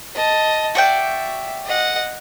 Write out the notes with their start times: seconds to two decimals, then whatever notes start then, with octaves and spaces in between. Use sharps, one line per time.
0.15 D#5 A5
0.75 F#4 D5 E5 G5
1.65 D#5 F#5